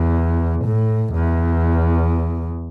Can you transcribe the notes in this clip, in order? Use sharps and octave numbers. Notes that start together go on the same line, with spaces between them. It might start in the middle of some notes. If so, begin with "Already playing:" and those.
Already playing: E2
A2
E2